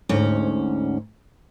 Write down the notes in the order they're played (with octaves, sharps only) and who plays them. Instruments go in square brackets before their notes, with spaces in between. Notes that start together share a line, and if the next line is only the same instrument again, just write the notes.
[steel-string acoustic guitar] D2 G#2 C#4